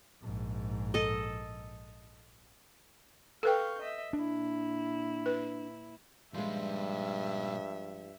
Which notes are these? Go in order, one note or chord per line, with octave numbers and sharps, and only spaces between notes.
A#1 G#2
A4 D#5
A4 B4 F5 G5 C#6 G6
D#5 E5
A#2 D4 E4
B4
G2 A#2 F3 G3 G#3 E5